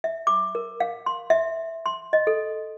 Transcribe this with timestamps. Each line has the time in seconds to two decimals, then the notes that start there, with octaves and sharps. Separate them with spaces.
0.04 E5
0.27 D6
0.55 A#4
0.80 F5
1.06 C6
1.30 E5
1.86 C6
2.13 D#5
2.27 A4